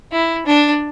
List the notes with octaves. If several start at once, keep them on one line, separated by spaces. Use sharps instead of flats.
E4
D4